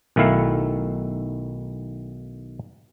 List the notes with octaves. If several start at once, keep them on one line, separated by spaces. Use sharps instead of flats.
B1 D#3 A3 E4 F5